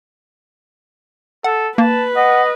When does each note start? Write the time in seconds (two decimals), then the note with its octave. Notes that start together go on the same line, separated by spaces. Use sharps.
1.44 A4 F#5
1.78 A#3 B4 A5
2.16 D#5 F#5